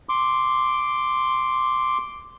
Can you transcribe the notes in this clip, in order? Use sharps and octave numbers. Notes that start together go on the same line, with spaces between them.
C6 D6